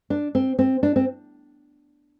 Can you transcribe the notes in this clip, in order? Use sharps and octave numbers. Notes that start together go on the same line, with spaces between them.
D4
C4
C4
D4
C4